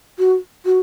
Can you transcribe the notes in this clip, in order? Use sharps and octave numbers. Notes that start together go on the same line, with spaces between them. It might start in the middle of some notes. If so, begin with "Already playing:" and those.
F#4
F#4